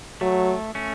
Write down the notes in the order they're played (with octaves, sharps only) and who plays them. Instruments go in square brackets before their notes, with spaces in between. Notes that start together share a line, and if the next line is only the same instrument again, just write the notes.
[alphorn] F#3 [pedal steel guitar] A3
[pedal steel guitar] A3 C#4